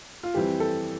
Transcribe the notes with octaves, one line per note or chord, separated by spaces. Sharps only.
F4
F2 E3 G3 C4 G4
A4